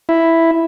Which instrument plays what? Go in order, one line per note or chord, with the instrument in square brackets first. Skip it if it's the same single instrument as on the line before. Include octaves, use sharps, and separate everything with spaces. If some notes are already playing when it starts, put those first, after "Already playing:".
[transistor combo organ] E4